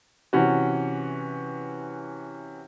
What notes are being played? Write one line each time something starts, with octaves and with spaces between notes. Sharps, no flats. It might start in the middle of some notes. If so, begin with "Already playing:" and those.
C3 E3 C#4 F#4